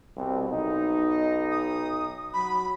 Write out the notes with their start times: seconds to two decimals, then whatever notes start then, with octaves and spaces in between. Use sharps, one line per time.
0.16 C2 B2 C4
0.49 B1 D#4
1.10 D#5
1.51 D#6
2.33 F#3 B5